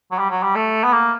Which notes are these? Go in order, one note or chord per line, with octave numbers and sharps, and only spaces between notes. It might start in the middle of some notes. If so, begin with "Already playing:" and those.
F#3
G3
F#3
G3
A3
B3
A#3